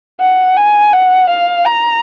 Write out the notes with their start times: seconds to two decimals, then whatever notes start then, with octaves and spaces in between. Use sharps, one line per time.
0.20 F#5
0.56 G#5
0.93 F#5
1.29 F5
1.65 A#5